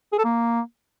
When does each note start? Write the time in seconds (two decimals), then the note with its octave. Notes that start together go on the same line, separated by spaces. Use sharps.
0.13 G#4
0.18 A4
0.24 A#3